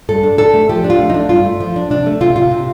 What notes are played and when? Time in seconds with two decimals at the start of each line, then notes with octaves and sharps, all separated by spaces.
0.09 G2 A4
0.23 D4
0.38 D4 A4
0.54 A3
0.69 F3 G4
0.84 D4
0.90 F4
0.99 A3
1.10 D#4
1.14 D4
1.29 G2 F4
1.45 A3
1.60 F3
1.76 D4
1.90 C3 D4
2.06 A3
2.21 C3 F4
2.36 C3 F4
2.51 C3